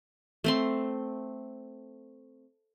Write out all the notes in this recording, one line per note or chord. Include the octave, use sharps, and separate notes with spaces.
A3 C4 C6